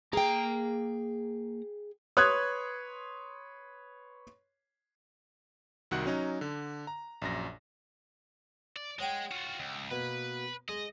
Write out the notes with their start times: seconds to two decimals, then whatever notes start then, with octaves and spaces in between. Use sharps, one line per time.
0.13 A#3 G#4 G5 A#5
2.17 B4 C#5 C6 D#6 F#6 G#6
5.91 C2 D#3 F#4 F#5 F#6
6.06 F#3 C#4 D#4
6.41 D3
6.87 A#5
7.22 A#1 F#2 A#6
8.76 D5
8.99 G#3 C#5 F#5 G5
9.31 F4 F#4
9.60 C#2
9.91 B2 A#3 B4
10.68 G#3 D#5